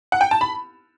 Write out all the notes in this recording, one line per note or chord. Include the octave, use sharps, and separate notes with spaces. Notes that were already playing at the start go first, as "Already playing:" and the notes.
F#5
G5
A5
B5